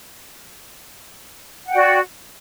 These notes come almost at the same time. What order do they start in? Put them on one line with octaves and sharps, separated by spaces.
F#5 G5 F#4 D5